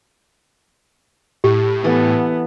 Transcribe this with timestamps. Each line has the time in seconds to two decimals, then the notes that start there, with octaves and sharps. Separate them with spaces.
1.44 A2 G4
1.84 E3 B3 A4 G#5